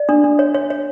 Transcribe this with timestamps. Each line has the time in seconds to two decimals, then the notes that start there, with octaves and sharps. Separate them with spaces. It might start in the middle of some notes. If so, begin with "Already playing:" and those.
Already playing: D5
0.09 D4
0.24 D4
0.39 C#5
0.54 C#5
0.70 C#5